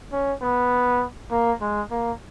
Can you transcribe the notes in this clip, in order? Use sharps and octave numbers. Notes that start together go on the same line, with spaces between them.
C#4
B3
A#3
G#3
A#3